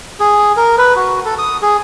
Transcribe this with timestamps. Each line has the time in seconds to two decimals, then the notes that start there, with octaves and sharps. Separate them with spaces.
0.20 G#4
0.57 A#4
0.78 B4
0.96 F#4
1.25 A4
1.38 D#6
1.62 G#4